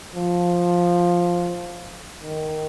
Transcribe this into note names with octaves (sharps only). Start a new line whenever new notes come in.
F3
D#3